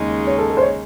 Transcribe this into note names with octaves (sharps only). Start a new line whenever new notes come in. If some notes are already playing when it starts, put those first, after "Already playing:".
Already playing: D#2 C#3 G#3 D#4
C#5
A4
A4
C5
C#5